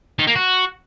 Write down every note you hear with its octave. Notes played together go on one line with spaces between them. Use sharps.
D#3
A#3
F#4